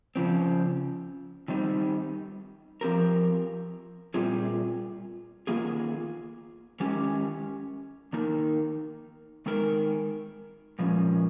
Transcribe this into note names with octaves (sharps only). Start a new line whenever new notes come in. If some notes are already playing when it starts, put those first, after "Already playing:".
C#3 F3 C4
D#3 G3 C4 D#4
F3 C4 G4 A#4
A#2 G3 C4 F4 G#4
D#3 A#3 F4 G#4
D#3 G#3 C#4 G4
D#3 A#3 D#4 A#4
D#3 G#3 D#4 A#4
A#2 F3 G#3 C#4